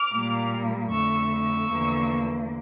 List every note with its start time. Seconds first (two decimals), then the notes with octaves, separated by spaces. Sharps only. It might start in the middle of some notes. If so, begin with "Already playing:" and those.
Already playing: D6 F6
0.13 A#2 G3 A#3
0.91 F2 D3 A3 C#6 E6
1.30 C#6 E6
1.69 E2 D3 F3 A#3